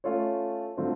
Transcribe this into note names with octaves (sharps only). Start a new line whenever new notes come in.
A3 C#4 F4 A4 C#5
D3 F#3 A3 C4 F4